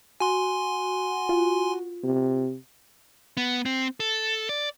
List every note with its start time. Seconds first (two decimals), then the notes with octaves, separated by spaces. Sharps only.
0.20 F#4 G#5 C6
1.29 F4
2.04 C3
3.37 B3
3.65 C4
4.00 A4
4.49 D5